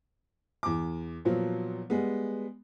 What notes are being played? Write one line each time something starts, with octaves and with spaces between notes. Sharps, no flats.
E2 D6
A#2 F3 F#3 B3
G3 G#3 B3